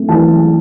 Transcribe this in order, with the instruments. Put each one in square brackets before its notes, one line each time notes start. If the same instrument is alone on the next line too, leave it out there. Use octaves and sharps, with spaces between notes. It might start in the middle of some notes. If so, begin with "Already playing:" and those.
Already playing: [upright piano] A3 C4
E3 A5